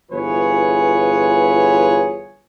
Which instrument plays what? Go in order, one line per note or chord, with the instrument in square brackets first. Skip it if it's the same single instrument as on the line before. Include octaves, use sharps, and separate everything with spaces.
[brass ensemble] G1 E3 F4 G#4 B4 C#5